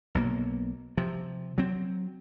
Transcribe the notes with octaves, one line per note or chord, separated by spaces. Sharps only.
B1 B2 A#3
C3 F3
F#3 C4